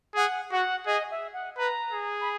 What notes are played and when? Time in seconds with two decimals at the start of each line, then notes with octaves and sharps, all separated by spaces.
0.15 G#4 F#5
0.51 F#4 F#5
0.86 G#4 D#5
1.11 E5
1.33 F#5
1.57 B4 A#5
1.92 G#4
2.21 B5